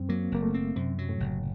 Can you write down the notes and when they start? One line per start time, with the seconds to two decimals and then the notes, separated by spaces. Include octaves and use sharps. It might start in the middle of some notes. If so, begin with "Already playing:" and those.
Already playing: F#2 C4
0.09 F#3 A#3
0.32 F#1 A#3
0.42 A3
0.54 C4
0.76 F#2 C3
0.99 F#3
1.09 A2
1.20 F#1